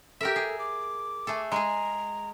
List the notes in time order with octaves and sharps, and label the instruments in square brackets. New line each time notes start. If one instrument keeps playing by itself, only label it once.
[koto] G4 A#4 E5 [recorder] A4
[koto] G#4
[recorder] D6
[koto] A3 G#4 A4
[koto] G#3 G#4 [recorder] A#5